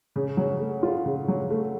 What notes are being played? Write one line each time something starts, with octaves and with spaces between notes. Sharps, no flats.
C#3
F#3
A3
F4
C#3
F#3
A3